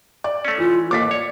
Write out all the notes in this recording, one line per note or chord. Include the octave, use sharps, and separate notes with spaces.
D5
A3 C#4
E3 F4
A1 D#2 A#3 D6 A6 B6
C#5 D5